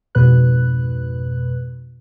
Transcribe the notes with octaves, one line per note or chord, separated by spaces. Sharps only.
F2 G#2 B2 B4 F#6